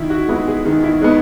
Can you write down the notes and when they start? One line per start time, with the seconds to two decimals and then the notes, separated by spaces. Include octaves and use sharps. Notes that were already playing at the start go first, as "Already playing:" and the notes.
Already playing: D#3 E4
0.10 F#4
0.28 G#3 B3 E4
0.47 G#4
0.65 D#3 G#4
0.83 E4
1.01 G#3 B3 D#4